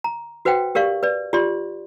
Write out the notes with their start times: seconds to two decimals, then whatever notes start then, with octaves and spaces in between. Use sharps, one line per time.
0.04 A#5
0.45 F#4 B4 C5 F#5 G5
0.75 G4 A#4 D5 F5 C#6
1.03 B4 D5
1.33 F4 G4 D5 C6